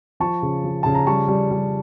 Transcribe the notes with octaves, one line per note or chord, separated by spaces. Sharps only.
F3 A5 C#6
C#3
F3
C#3 A5
A#5
G3 A5 C#6
G3
G3